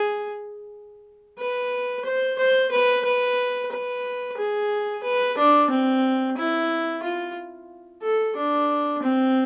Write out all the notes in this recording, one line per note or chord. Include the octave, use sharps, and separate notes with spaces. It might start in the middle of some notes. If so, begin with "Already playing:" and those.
Already playing: G#4
B4
C5
C5
B4
B4
B4
G#4
B4
D4
C4
E4
F4
A4
D4
C4